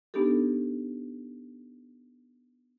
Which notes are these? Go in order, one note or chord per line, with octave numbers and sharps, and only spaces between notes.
B3 D4 D#4 G4 A4